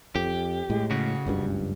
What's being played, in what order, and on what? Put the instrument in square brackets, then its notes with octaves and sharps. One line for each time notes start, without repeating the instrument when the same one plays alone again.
[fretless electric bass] F2 [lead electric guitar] G4
[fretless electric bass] A2 G#3
[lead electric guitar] C#3 F#4
[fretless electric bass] F#1 C#2 G2